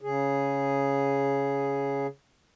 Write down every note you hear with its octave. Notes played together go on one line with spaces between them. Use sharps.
C#3 G#4